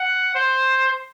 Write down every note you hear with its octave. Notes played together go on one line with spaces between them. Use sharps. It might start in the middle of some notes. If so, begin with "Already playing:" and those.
Already playing: F#5
C5